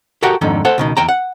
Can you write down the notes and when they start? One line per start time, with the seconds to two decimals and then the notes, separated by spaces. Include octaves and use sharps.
0.23 F#4 G4 A4 A#4 F#5
0.41 F2 G#2 D3 D#3
0.65 A4 C5 F#5
0.78 C#2 B2 D#3
0.97 E2 G5 A#5
1.09 F#5